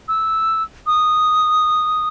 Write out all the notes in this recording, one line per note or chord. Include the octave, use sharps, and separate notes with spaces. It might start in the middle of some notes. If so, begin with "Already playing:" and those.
E6
D#6